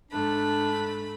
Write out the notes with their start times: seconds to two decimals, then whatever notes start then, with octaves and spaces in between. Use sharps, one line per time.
0.11 G#2 A3 D4 B5